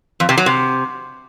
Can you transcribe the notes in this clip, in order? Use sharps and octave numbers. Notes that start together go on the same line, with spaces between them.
F2
C3
F#3
C3